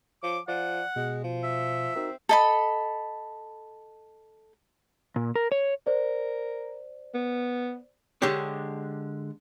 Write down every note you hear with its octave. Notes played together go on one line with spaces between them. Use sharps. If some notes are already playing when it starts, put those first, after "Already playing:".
F3 C#5 D6
F3 D5 F#5
B2 G#3
F3
E5
C4 D#4 F#4 A#4
A4 D#5 B5
A#2
A#4
C#5
A#4 C5 D5
B3
D3 G#3 D4 G4 C#5